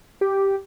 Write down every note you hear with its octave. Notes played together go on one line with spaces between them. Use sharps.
G4